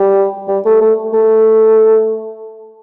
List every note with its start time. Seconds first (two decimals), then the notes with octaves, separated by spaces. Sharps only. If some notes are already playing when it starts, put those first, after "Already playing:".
Already playing: G3
0.48 G3
0.65 A3
0.81 A3
1.13 A3